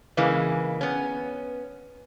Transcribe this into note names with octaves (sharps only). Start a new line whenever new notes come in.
C#3 E3 G#3 A#3
B3 C#4